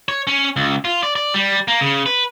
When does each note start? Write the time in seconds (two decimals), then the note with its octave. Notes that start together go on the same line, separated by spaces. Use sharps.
0.08 C#5
0.27 C#4
0.56 C#2
0.85 F4
1.03 D5
1.16 D5
1.34 G3
1.68 A#3
1.81 C#3
2.06 B4